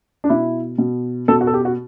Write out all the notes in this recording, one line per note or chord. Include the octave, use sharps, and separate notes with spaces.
D4
B2 E4
B2
B2 A4
F#4
A4
G4
F#4